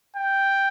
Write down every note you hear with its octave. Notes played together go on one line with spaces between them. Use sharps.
G5